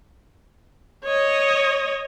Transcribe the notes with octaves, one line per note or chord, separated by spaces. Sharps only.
C#5 D#5